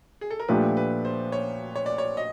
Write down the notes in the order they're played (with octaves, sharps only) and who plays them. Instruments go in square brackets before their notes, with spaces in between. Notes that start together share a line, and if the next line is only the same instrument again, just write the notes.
[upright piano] G#4
A4
A#4
[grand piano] A#2 F3 A3 D4 G4 [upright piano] B4
[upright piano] B4
C5
C#5
C#5
D5
C#5
D#5